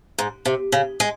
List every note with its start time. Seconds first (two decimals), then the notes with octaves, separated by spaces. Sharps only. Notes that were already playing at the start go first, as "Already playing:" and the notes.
0.18 G#2
0.45 C3
0.72 C#3
1.00 G#3